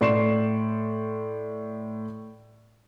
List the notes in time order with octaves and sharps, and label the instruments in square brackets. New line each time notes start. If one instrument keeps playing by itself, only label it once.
[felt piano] A2 D5 C6 C#6 C7 E7